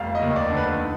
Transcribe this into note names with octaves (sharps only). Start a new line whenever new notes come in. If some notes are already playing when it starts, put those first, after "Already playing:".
Already playing: F1 G3 F5
D#5
D#2
D5
D3
B4
D#4